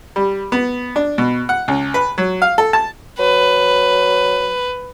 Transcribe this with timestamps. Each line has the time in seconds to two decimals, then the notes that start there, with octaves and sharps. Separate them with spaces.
0.16 G3
0.52 B3
0.96 D4
1.18 B2
1.49 F#5
1.68 C#2
1.94 B4
2.18 F#3
2.42 F5
2.58 A4
2.73 A5
3.19 F#3 B4